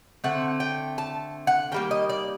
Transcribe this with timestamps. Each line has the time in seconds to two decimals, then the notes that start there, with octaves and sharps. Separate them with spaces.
0.24 D3 A3 C4 F#5
0.60 G5
0.98 A5
1.47 F#5
1.72 D#3 G3 A#3 G5
1.91 D#5
2.09 D5